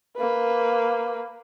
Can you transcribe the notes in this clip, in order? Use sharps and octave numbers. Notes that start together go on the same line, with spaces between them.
A#3 B4